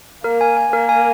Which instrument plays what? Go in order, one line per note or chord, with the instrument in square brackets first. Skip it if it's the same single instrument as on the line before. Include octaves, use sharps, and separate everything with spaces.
[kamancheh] A#3 [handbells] A#4
[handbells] G#5
G#5
[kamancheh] A#3 [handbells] A#4
[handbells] G#5